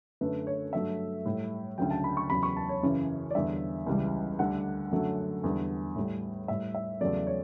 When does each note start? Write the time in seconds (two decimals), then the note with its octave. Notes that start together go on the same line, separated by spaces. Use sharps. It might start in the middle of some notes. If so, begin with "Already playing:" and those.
0.21 F#2 D3 A3 B4
0.47 C#5
0.73 G2 F#3 A3 E5
1.25 A2 G3
1.78 D2 C#3 F#3 G5
1.91 A5
2.04 B5
2.17 C#6
2.30 E2 C#3 F#3 B5
2.43 C#6
2.56 A5
2.69 C#5
2.83 F#2 C#3 E3
3.30 D5
3.35 E2 D3 G3 E5
3.86 C#2 C#3 E3 G3
4.39 D2 D3 G3 F#5
4.91 F#2 D3 F#3 A3
5.44 E2 D3 G3
5.96 A2 G3
6.48 A2 G3 E5
6.75 E5
7.01 E2 C#3 F#3 A3 D5
7.27 C#5